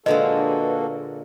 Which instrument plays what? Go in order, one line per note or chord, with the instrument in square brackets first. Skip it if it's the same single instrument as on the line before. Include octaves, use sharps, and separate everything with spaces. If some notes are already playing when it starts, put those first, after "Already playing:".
[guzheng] A#2 D3 G#3 [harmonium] A#3 F#4 A4 [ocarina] B4 [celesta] D#5